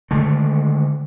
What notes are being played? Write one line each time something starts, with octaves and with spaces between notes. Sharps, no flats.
D3 D#3 G#3 A3